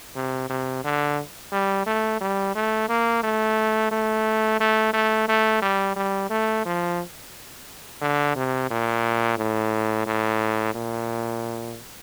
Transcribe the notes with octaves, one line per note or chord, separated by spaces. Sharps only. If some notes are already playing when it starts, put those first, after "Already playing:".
C3
C3
D3
G3
A3
G3
A3
A#3
A3
A3
A3
A3
A3
G3
G3
A3
F3
D3
C3
A#2
A2
A2
A#2